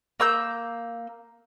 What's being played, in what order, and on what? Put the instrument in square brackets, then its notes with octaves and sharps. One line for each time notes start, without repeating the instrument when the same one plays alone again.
[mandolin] A#3 E6 G6